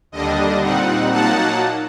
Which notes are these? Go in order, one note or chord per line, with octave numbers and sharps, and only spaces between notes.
D#2 D3 G3 D4 D#5
A#2 G3 C4 D#4 F#5
A#2 F#3 A#3 D#4 F#5 A5